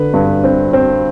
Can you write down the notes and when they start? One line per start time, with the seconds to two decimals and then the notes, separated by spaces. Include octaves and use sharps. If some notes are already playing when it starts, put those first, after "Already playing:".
Already playing: D3 B4
0.14 G2
0.44 C4
0.73 C4